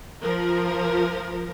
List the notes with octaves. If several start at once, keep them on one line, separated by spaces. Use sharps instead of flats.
F3 A#4